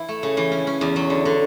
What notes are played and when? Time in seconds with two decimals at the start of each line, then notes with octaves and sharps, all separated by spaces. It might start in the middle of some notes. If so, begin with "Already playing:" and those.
Already playing: E3 E4
0.08 A3
0.23 C#3
0.37 E3
0.52 C#4
0.67 C#4
0.81 E2
0.96 F#3
1.10 D3
1.25 D3